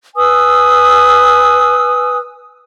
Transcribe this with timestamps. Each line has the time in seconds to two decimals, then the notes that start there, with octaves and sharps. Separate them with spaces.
0.16 B4 G#5 D#6 E6